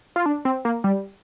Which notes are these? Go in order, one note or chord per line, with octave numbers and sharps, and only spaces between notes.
F4
D4
C4
A#3
G3